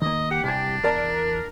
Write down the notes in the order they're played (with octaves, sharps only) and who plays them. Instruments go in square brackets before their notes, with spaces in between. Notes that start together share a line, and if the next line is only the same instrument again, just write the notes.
[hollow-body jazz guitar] D#3 A#3 [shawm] D#5
[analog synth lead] G4 [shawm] F#5
[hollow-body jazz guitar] C2 G#5 [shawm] D4
[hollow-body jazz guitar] E2 D5 A5 [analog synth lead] A#4